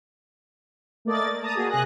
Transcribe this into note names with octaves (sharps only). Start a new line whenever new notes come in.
A3 A#3 D5 D#5 A6
A5 A#5 D#6
A#3 F#4 G#4
C3 G#4 F#6 A#6